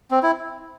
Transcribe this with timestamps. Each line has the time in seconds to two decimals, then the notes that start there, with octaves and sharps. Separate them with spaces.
0.11 C4
0.23 E4